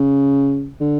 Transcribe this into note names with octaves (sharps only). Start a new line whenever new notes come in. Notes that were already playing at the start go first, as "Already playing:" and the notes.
Already playing: C#3
D3